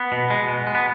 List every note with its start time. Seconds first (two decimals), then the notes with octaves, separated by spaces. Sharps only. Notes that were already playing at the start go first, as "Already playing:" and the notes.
Already playing: B3
0.12 B2
0.30 G#3
0.48 B2
0.67 G#3
0.75 B3